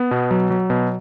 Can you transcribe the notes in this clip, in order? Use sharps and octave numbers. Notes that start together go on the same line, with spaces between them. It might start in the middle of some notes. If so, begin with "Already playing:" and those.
Already playing: B3
B2
F#3
F#3
B2